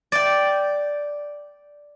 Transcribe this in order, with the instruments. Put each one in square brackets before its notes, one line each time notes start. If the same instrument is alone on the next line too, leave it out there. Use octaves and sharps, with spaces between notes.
[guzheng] D5 G5